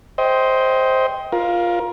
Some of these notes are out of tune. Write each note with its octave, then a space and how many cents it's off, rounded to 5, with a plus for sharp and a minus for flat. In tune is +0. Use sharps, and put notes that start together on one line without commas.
C5 +0 D#5 +30 G5 +0
F4 +0 A#4 +25